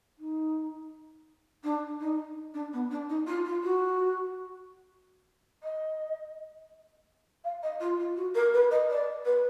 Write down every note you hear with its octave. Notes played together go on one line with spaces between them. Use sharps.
D#4
D4
D#4
D4
B3
D4
D#4
F4
F4
F#4
D#5
F5
D#5
F4
F4
F#4
A#4
B4
D#5
D5
B4